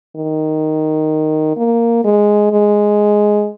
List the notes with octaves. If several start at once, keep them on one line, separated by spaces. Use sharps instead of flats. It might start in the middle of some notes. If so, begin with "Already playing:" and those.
D#3
A#3
G#3
G#3